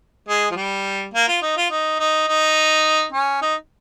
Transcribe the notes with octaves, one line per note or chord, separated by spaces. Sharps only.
G#3
F3
G3
A#3
F4
D#4
F4
D#4
D#4
D#4
C#4
D#4